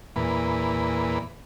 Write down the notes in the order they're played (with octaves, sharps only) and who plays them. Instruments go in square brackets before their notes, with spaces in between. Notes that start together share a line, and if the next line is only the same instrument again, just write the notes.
[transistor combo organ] E2 A#2 B4